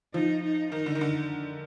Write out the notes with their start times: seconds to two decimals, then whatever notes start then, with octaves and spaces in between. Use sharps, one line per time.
0.14 F3 D#4
0.43 D#4
0.72 D#3 D#4
0.86 D3
0.95 D#3
1.01 D3